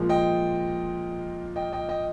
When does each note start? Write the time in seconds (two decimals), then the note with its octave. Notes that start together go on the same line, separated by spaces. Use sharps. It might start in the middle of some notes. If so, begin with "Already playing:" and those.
Already playing: A#2 F3 G#3
0.09 D#5 G5
1.56 D#5 G5
1.73 D#5 G5
1.89 D#5 G5